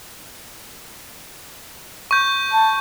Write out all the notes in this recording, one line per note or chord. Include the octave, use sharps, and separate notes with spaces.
C#6 G6
A5